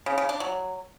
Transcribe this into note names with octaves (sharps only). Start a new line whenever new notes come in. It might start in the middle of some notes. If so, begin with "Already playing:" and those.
C#3
C#3
D4
F#3